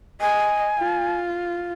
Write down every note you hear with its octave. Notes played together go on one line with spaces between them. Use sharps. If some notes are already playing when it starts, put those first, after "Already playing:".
D#5 G#5
F4